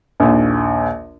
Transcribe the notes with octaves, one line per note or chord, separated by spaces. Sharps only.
A#1 D#2